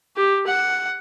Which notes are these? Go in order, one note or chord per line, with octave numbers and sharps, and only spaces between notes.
G4
F#5